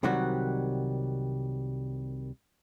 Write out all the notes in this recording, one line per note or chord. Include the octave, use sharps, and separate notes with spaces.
C2 C3 D#3 F#3 G3 F#4